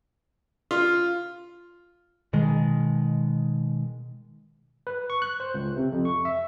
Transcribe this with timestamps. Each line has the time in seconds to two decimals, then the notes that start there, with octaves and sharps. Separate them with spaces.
0.71 F4
2.33 B2 D#3 G#3
4.87 B4
5.10 C#6
5.22 F#6
5.40 C5
5.54 C#2
5.76 C3
5.92 F2
6.05 C#6
6.25 E5